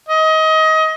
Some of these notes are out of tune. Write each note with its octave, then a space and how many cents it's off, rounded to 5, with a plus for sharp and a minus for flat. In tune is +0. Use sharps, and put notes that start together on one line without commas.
D#5 +25